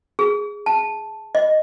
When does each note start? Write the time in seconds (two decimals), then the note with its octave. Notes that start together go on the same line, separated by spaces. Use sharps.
0.19 G#4
0.66 A5
1.35 D#5